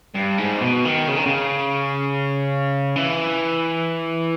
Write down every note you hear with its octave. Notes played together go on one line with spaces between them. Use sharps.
G2
G#2
B2
D#3
C#3
D#3
C#3
E3